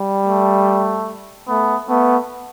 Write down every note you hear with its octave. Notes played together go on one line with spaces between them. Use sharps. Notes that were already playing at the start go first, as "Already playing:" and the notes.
Already playing: G3
A3
A3 B3
A3 B3